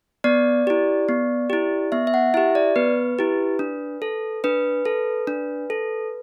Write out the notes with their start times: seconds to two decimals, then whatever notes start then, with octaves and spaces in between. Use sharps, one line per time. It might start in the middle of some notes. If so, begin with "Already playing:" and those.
0.24 B3 D5
0.67 E4 G4
1.09 B3
1.50 E4 G4
1.92 B3 E5
2.07 E5
2.14 F#5
2.34 E4 G4 E5
2.55 D5
2.76 B3 B4
3.19 E4 G4
3.59 D4
4.02 A4
4.44 D4 B4
4.85 A4
5.27 D4
5.70 A4